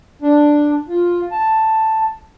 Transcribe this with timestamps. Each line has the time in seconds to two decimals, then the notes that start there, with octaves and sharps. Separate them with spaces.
0.22 D4
0.88 F4
1.31 A5